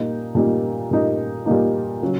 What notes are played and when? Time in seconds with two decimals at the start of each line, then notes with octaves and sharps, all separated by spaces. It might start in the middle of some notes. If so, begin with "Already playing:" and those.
Already playing: A#2 G3 A#3 D#4
0.35 A#2 G3 A#3 D#4
0.91 A#2 G3 A#3 D#4
1.46 A#2 G3 A#3 D#4
2.02 C#3 F#3